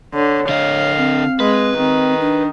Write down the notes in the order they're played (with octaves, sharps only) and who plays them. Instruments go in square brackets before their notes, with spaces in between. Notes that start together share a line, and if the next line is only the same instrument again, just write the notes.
[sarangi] D3 [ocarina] C#5
[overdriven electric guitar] D3 D#5 [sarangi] F5
[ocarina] C4
[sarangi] G#3 [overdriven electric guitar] B4
[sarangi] D#3 [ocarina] C4
[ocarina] D4